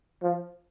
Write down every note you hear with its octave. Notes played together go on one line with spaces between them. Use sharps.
F3